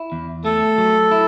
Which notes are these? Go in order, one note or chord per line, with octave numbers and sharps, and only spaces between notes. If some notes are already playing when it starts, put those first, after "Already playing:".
Already playing: E4
E2
A3 A4
F#3
E4